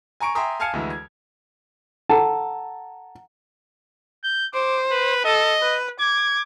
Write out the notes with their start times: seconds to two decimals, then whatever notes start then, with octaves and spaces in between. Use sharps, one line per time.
0.20 G#5 A#5 C#6 D7
0.35 E5 G5 G#5 A#5 C6 D#6
0.60 F5 G#5 A5 F6 G#6 C#7
0.73 D2 D3 E3 G#3
0.90 G#6
2.10 A4 F#5 A5 A#5
4.23 G6
4.54 C5 D6
4.91 B4
5.25 A4 D#5
5.62 B4
6.00 D6 G#6